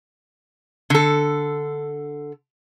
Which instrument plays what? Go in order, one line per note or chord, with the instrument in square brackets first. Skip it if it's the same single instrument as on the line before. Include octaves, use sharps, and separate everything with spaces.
[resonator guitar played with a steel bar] D3 A4